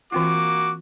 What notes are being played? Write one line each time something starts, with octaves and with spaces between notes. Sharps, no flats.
E3 A#3 C4 F4 F#4 D6